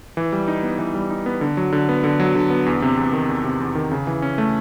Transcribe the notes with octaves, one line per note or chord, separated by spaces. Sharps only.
E3
G3
D#4
B3
E3
G3
D#4
B3
D3
F#3
D3
B3
D3
F#3
D3
B3
E2
C3
E2
D#3
E2
C3
E2
D#3
C#3
E3
C#4
A3